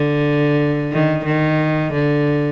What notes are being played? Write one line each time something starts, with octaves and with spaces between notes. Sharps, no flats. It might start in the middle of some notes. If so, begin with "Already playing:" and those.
Already playing: D3
D#3
D#3
D3